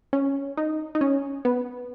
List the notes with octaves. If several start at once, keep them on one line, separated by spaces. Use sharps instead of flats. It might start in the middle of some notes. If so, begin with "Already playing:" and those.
C#4
D#4
D#4
C#4
B3